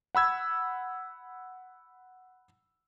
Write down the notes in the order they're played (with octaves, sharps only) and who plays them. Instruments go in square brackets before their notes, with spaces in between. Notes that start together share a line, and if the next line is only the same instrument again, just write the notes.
[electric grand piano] F#5 B5 E6 G#6